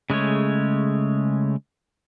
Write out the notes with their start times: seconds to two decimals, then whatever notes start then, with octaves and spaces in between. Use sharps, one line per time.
0.10 C#3 G#3 A3 C#5